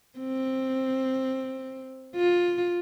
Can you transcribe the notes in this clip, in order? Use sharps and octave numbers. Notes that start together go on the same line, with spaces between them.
C4
F4